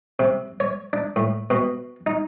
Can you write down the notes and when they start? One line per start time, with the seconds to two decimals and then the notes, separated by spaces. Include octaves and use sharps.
0.19 C3
0.60 C#5
0.93 D4
1.16 A2
1.50 B2
2.07 D#4